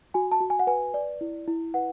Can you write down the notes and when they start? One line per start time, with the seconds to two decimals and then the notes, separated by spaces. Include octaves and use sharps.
0.14 F#4 G#5
0.32 A5
0.41 F#4
0.50 G#5
0.59 F#5
0.67 B4 G#5
0.94 D5
1.21 E4
1.48 E4
1.74 B4 F#5